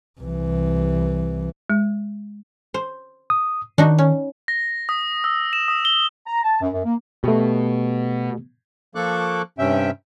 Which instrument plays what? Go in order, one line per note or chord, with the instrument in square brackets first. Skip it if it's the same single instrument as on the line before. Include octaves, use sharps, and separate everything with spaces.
[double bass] C2 E3
[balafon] G#3
[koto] C5
[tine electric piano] D#6
[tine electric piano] D#3 [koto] D4 D#4 F#4
[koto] C#4
[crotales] A#6
D#6
E6
E7
D#6
G7
[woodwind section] A#5
A5
F#2
F#2
A#3
[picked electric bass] B2 [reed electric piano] A3 G4
[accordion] F3 A#3 A4 C#6 D6 F#6
G2 C3 C#4 E5 G5